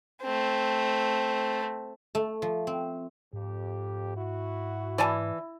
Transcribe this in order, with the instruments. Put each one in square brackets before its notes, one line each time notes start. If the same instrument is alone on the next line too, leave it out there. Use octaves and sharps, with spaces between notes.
[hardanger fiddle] A3 C4
[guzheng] A3
F3
C4
[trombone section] F2 G4 [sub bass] G#2
[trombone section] E4 F#4
[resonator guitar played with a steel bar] E3 [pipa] D5 G#5 A5